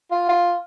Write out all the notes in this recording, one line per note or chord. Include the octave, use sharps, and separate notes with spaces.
F4
F4